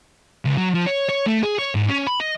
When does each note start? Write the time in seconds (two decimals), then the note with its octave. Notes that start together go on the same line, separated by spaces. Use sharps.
0.45 C#2
0.57 F#3
0.74 F3
0.86 C#5
1.09 C#5
1.26 A3
1.43 G#4
1.59 C#5
1.75 G#2
1.89 C#4
2.07 B5
2.20 D#5